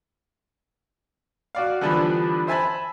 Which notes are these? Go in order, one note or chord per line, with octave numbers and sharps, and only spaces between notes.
F#4 D5 F5
D3 E3 F3 G3 B3 D4
C5 E5 G#5 A5 B5